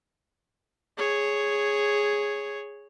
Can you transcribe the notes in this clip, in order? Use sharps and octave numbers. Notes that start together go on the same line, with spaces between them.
G#4 C#5